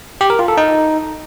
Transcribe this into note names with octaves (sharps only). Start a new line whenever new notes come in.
G4
A#4
F4
A4
D#4